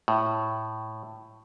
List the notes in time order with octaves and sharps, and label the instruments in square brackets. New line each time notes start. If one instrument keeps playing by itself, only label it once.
[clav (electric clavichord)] A2